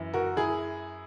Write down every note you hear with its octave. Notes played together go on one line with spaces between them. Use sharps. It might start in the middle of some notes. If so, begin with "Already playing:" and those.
Already playing: F#2 E3
F#4 A#4
E4 G#4